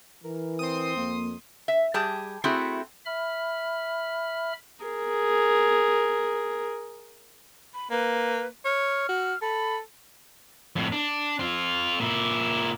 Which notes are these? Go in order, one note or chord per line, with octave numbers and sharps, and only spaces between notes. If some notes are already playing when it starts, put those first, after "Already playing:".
E3 A#4
C4 C6 D#6
F2 A#3
E5
G3 G4 G#4 A5
A3 C4 E4 F#4 G#4
E5 B5 F6
G#4 A#4
B5
A#3 B4
C#5 F6
F#4
A4 B5
F2 A2
D4
C4 F4
A#2 E4